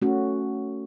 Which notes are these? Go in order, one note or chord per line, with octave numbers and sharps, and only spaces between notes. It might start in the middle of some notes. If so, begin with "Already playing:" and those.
A3 C#4 F#4